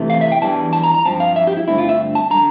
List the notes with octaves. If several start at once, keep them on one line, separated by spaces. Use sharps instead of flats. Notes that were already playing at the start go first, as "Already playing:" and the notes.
Already playing: C3 E3 A3
F5
E5
G5
E2 E3 G3 D4 A5
A5
A#5
A#5
G2 F3 C4 A5
F5
E5
G4
E4
G2 D3 A3 C4 E4
F4
E5
A5
D3 G3 D4 A#5